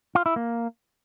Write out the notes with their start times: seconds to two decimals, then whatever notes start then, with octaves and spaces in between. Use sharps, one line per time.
0.15 F4
0.26 E4
0.36 A#3